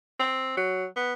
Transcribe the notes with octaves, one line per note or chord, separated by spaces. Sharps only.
C4
F#3
B3